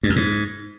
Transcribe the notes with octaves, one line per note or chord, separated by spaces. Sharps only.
G2
F2
G#2